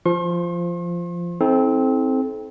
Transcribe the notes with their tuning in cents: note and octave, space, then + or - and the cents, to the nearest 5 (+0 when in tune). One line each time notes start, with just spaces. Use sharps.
F3 -10 C6 +45
C4 +5 D#4 +45 A4 -30